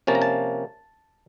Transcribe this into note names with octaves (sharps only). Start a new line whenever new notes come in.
C3 F3 A#3 C#4 A5
A#5
A5